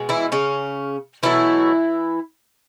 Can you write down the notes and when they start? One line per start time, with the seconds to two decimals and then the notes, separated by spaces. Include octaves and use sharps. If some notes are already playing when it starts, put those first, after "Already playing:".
Already playing: B2 G#3
0.09 E3 E4
0.32 C#3 C#4
1.23 B2 E3 F#3 A3 E4